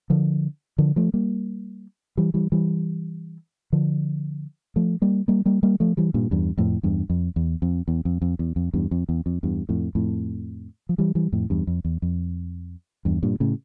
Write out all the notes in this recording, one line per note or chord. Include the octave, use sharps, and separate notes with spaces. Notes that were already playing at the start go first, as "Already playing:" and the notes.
D3 F3
D3 F3
F3 A3
G3 A#3
E3 G3
E3 G3
E3 G3
D3 F3
F3 A3
G3 A#3
G3 A#3
G3 A#3
G3 A#3
F3 A3
E3 G3
G2 A#2
E2 G2
F2 A2
E2 G2
F2
E2
F2
E2
F2
F2
E2
F2
E2 G2
F2
E2
F2
E2 G2
F2 A2
F2 A2
F3
E3 G3
E3 G3
F2 A2
E2 G2
F2
E2
F2
E2 G2
G2 A#2
A2 C#3